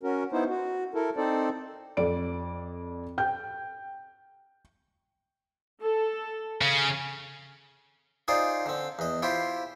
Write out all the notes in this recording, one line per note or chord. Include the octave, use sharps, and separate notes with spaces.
C#4 F#4 A#4
B3 D#4 E4 C5
F#4
E4 A4 A#4
C4 D#4 A4 C5 D5
F2 D5 D7
G5 G6
A4
C#3
D#4 F4 G#4 C5 D5
D3 C4
E2 D#5
E4 F4 G4 C5